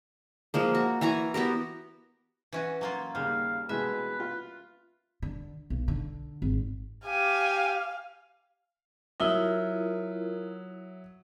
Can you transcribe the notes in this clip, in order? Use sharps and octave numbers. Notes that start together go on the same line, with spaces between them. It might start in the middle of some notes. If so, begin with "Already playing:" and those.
F3 G#3 A#3
F#4
E3 G#5 A#5 C#6
B3 F#4 G4 A#4
E3 C#4 F#4
F#3 A#3 F4
D#2 C#3 G3 F5
B2 E3 G#3 B4 E5
F4
D3
B1
D3
G#1
G4 F5 G#5
F#3 E4 F4 A#4 E5 D#6